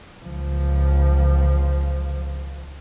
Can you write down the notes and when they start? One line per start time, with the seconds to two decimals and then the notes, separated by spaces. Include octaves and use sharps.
0.24 C#2 F3